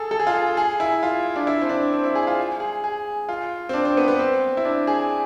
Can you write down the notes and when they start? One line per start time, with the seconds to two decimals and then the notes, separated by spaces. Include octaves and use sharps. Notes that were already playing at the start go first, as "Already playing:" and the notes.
Already playing: G#4 A4
0.11 A4
0.20 G#4
0.27 F4
0.34 G#4
0.57 G#4
0.80 E4
1.03 F4
1.36 D4
1.47 E4
1.62 C4
1.69 D4
1.93 C4
2.04 E4
2.15 G#4
2.27 F4
2.60 G#4
2.84 G#4
3.29 F4
3.69 C4
3.73 D4
3.85 C4
3.97 B3
4.08 B3
4.19 C4
4.57 E4
4.65 D4
4.87 G#4